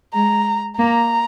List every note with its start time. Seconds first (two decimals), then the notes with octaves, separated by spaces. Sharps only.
0.14 G#3 A#5
0.79 A#3 A#5